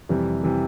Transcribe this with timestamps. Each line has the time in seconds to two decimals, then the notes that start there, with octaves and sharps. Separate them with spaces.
0.09 F2 C3 E3 G3
0.43 C3 E3 G3